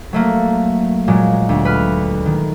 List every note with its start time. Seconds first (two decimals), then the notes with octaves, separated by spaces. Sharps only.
0.13 F#3 A3 A#3
1.08 A#2 F#3 G#3
1.49 D2
1.65 B4 F6
2.25 D#3